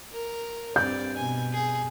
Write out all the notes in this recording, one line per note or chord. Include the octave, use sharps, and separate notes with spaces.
A#4
G2 C4 D5 G6
B2 G#5
G#4